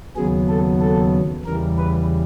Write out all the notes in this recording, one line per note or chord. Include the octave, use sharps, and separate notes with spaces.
D#2 C#3 F#3 B3 G#4
A4
A4
E2 C#3 E3 G3 A#4
B4